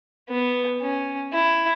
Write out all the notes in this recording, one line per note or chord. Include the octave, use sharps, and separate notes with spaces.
B3
C#4
E4